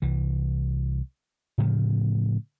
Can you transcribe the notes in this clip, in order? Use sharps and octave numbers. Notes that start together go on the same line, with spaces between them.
C2 E3
A2 C#3 F3 A3